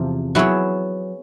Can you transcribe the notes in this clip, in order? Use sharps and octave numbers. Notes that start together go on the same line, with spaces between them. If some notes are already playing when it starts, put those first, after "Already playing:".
Already playing: E2 C3 F3
F#3 B3 E4 G#4 C#5